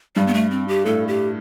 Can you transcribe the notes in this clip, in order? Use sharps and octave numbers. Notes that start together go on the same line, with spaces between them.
G2 G3
B3
A3
C4
G4
A2 A4
G4